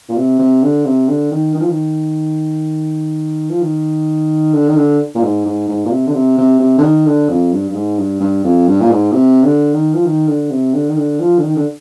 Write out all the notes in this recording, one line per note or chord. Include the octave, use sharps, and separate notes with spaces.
A#2
C3
C3
D3
C3
D3
D#3
D#3
F3
D#3
F3
D#3
D3
D#3
D3
A#2
G#2
G#2
G#2
A#2
C3
D3
C3
C3
C3
D3
D#3
D3
F2
G2
G2
G#2
G2
G2
F2
G2
A#2
G#2
C3
D3
D#3
F3
D#3
D3
C3
D3
D#3
D3
F3
D3
D#3
D3